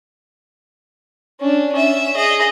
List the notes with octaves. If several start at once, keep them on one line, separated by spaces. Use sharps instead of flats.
C#4 D4
C#4 E5
G#4 D#5